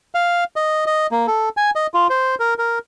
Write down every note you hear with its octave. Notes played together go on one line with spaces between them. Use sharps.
F5
D#5
D#5
A#3
A4
G#5
D#5
F4
C5
A#4
A#4